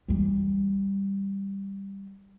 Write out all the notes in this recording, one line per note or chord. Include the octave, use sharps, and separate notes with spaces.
E3 G3